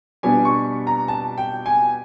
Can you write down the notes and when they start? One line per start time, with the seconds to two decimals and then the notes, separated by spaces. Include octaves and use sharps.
0.23 B2 G3 B3 D4 G#5
0.45 C#6
0.87 A#5
1.08 A5
1.38 G5
1.66 G#5